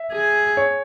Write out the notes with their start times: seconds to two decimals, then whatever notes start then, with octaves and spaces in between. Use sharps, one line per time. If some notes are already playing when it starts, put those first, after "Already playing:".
Already playing: E5
0.12 G#4
0.57 C#5